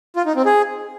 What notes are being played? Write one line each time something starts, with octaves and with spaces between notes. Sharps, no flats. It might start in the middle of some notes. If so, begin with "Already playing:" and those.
F4
D#4
C4
G#4